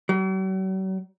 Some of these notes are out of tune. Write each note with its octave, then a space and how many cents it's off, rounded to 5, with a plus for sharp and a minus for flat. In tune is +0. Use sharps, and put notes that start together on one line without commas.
F#3 +45